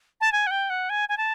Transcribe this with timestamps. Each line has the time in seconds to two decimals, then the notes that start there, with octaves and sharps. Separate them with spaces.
0.21 A5
0.32 G#5
0.47 F#5
0.51 G5
0.70 F#5
0.90 G#5
1.09 G#5
1.17 A5